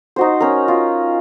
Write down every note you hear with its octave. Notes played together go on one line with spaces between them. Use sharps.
D#4 F#4 C5
C#4 A#4
F4